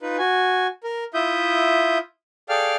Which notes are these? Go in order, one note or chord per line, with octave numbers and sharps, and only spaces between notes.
D#4 F4 B4
F#4 G#5
A#4
E4 F4 E5 D#6 G6
G#4 A4 D5 F5 G5 F6